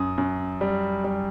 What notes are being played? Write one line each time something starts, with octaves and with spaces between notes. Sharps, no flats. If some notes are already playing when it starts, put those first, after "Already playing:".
Already playing: F#2 D#6
F#2
G3
G3